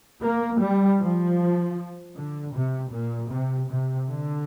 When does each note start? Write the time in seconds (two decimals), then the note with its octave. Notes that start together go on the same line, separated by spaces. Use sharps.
0.24 A#3
0.61 G3
1.00 F3
2.17 D3
2.55 C3
2.93 A#2
3.31 C3
3.70 C3
4.09 D3